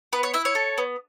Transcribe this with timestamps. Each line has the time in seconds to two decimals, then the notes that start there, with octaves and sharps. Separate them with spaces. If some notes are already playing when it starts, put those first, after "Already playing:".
0.13 B3 B4
0.23 C#5
0.34 E4 E5
0.45 C#5
0.55 A4
0.78 B3